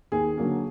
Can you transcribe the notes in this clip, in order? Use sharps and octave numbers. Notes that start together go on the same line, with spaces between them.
D#2 G#4
D3 F#3 A#3